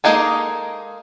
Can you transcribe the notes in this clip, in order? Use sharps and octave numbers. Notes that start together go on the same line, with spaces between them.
G#3 A#3 D#4 G#4 A4